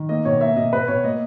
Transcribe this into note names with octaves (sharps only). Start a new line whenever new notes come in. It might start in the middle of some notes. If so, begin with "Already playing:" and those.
Already playing: D#3
A#3 D#5
B2 C#5
A#3 E5
B2 D#5
B2 B4
B2 C#5
A#3 D#5